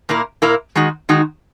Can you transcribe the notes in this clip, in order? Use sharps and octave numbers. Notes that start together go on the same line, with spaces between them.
A#2 A#3 E4 A#4
A#2 A#3 E4 A#4
D#3 G#3 D#4 F#4
D#3 G#3 D#4 F#4